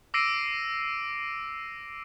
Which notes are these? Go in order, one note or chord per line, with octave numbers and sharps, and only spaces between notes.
D6 E6 A#6 C7 D7 D#7